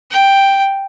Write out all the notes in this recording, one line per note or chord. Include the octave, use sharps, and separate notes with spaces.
G5